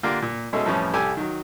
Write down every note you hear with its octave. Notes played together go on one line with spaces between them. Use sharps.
D3 A#3 D4 F4 G4
A#2
B2 G#3 C#4 D#4 A4 E5
F2 A2 E3 F3 G3 C#4
C2 G4 A4 D5 G#5 E6
D#3 F#3